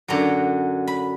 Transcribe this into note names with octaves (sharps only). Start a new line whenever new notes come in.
F#2 D3 F#3 A#5
B5